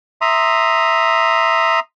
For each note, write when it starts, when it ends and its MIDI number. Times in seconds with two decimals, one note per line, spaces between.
0.21 1.80 76
0.21 1.80 82
0.21 1.80 84
0.21 1.80 87